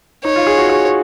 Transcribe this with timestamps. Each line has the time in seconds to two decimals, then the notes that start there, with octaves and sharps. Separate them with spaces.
0.24 D#4 C#5
0.36 F4
0.47 G#4
0.58 F#4
0.70 G#4